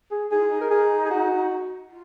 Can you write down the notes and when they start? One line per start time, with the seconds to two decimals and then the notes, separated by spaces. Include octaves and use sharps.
0.11 G#4
0.31 D#4 G#4
0.39 F4
0.48 D#4
0.61 A#4
0.70 G#4
1.05 G#4
1.10 F#4
1.89 F4